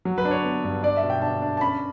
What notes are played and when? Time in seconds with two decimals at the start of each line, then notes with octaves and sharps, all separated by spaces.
0.05 F#3
0.18 B4
0.25 D4
0.31 C#5
0.44 B3
0.64 G2
0.83 D4 D5
0.97 E5
1.03 B2
1.10 G5
1.22 D4 A5
1.42 D4
1.57 A5
1.61 C#4 B5